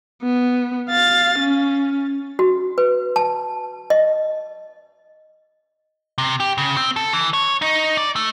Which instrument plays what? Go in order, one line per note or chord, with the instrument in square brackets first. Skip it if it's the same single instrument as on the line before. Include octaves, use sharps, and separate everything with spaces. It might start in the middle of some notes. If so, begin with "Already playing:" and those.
[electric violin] B3
F5 A6
C#4
[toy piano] F#4
B4
A5
D#5
[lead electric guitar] C3
G4
C#3
C4
A4
E3
C#5
D#4
D5
A3